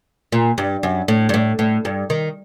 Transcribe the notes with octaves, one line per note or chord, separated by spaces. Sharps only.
A#2
G2
F#2
A2
G2
A2
A2
G2
D#3